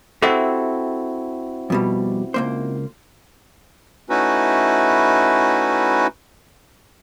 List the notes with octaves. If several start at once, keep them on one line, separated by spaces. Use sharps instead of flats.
C4 E4 F#4 G4 A4 E5
F2 B2 G3
C#2 A#3 C5
A3 C#4 D#4 E4 F#4 B4